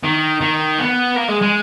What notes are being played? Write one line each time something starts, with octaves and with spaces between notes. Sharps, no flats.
D#3
D#3
B3
A#3
G#3
G#3